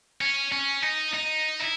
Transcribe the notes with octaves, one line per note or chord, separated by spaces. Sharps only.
C#4
C#4
D#4
D#4
E4